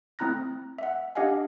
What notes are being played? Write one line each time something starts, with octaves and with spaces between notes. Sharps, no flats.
A3 C4 E4 A#5 F#6 A#6
E5 F#5
D4 G4 D#5 F5 F#5 G#5